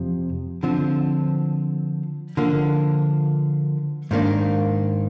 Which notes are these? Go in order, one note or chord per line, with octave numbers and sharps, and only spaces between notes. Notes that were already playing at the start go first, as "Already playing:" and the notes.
Already playing: F2 C3 F3
D3 F3 C4
D3 F3 A#3
G#2 D#3 A#3 D4